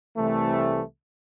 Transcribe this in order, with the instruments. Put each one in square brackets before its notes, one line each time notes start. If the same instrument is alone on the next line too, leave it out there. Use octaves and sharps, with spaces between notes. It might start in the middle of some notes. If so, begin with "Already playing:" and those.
[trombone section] C2 C3 E3 A3